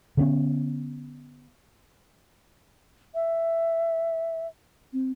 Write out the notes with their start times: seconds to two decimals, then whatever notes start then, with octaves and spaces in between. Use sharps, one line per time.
0.17 D3 B3 C#4
3.15 E5
4.93 C4